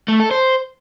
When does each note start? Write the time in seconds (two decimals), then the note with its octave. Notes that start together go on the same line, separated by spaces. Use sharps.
0.08 A3
0.20 A4
0.31 C5